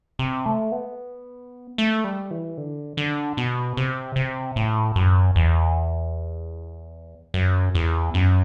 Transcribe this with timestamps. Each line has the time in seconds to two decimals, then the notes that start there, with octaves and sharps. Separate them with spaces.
0.19 C3
0.46 A3
0.72 B3
1.78 A3
2.04 G3
2.31 E3
2.57 D3
2.97 D3
3.37 B2
3.77 C3
4.16 C3
4.56 A2
4.96 F#2
5.36 E2
7.34 F#2
7.75 E2
8.14 F#2